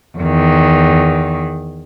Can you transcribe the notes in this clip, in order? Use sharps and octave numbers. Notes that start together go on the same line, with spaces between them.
E2 D#3